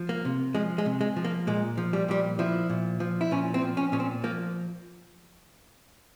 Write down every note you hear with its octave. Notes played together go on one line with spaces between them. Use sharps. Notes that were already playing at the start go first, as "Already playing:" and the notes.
Already playing: F3
A#3
C3
F3 G#3
G#3
C3
G#3
F3
A#3
A#2 G#3
F3
G3
A#2 G3
F3 E4
A#2
F3
E4
A#2 C#4
C4
F3
C#4
A#2 C#4
C4
F3 A#3